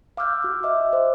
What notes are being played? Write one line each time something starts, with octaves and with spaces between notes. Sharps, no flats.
F5 D6 E6 F6 G6
F#4 D6
D#5 E5 D6
C5